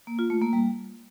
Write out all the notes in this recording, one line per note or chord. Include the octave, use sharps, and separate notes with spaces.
A#3
F4
A3
A#3
G3